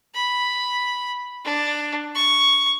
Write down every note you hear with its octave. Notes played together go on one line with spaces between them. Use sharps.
B5
D4
C#6